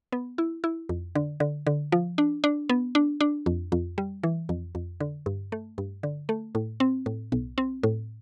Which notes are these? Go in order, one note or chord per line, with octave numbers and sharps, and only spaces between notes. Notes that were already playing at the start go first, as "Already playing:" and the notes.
B3
E4
E4
F2
D3
D3
D3
F3
D4
D4
B3
D4
D4
F2
F2
G3
E3
F2
F2
D3
G2
A3
G2
D3
A3
A2
C4
A2
B1
C4
A2